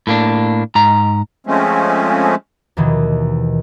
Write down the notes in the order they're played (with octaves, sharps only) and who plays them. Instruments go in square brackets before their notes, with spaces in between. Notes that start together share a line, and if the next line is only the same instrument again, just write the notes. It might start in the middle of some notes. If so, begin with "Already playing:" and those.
[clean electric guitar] A2 A#3 D4
G#2 A#5
[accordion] F3 G#3 A3 C4 C#4
[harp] D#2 B2 D#3 E3